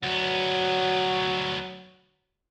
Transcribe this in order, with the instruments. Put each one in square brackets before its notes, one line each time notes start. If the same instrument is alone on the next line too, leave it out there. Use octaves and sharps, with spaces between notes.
[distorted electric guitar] D2 B3 [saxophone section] F#3